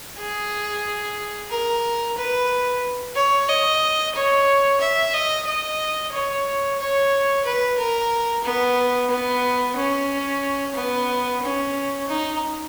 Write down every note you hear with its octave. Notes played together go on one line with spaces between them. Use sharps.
G#4
A#4
B4
C#5
D#5
C#5
E5
D#5
D#5
C#5
C#5
B4
A#4
B3
B3
C#4
B3
C#4
D#4